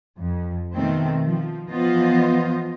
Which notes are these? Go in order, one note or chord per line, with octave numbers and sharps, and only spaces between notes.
F2
B2 D#3 A3 C4
F3
E3 F3 B3 F4 C5 D#5